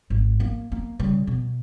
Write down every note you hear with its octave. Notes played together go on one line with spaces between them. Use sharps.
G#1
A#3
A#3
C#3 G3
B2